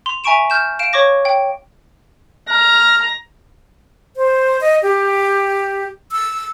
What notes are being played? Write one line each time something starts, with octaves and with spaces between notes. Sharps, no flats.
C6 F7
E5 G#5 A#5 C#6 D7 E7
F6 G6 E7
F5 D7 E7
C#5 C#6 D6 A#6
G5
A#5 F6
C5
D#5
G4
E6